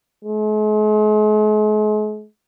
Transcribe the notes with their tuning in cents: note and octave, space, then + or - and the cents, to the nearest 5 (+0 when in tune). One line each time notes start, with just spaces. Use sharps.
G#3 +45